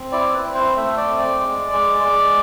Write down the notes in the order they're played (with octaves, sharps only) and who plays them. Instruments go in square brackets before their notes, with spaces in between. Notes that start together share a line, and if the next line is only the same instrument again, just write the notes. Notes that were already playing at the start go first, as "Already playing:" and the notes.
Already playing: [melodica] C4
E4 D5
B4
C4
C5
A3 E5
D5
C4
D5
G#3
G#3
G#3